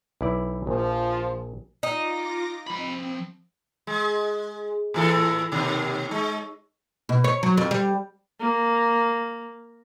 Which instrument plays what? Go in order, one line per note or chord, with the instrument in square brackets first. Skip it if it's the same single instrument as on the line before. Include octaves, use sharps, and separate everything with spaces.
[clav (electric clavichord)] B1 E4 D5
[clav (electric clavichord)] A#1 [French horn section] F3
[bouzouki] D#4 [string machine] F4 D6 A#6
[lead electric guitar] F3 B5 [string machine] C4
[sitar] G#3
A2 E3 A4
D#2 B2
G#3
[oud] B2
C#5
F#3
F2
G3
[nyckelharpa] A#3